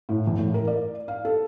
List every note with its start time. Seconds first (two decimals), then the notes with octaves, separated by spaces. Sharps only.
0.09 A2
0.27 E2
0.38 A2
0.54 A#4
0.67 D5
1.08 F5
1.25 A4